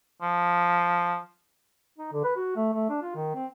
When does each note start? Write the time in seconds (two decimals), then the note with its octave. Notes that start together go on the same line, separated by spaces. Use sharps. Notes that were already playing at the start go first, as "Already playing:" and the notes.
0.22 F3
1.98 D#4
2.12 D3
2.24 B4
2.36 F#4
2.56 A3
2.74 A3
2.89 D4
3.02 F4
3.15 D#3
3.35 C4